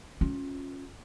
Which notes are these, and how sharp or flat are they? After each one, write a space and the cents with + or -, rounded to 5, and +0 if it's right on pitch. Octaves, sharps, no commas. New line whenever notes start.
C#4 -5 F4 +25